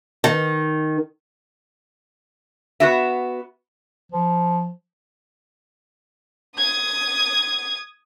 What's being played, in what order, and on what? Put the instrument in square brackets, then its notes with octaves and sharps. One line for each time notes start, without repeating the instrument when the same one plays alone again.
[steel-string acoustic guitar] D#3
[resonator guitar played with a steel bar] B3 F#4 E5
[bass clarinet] F3
[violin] D#6 G#6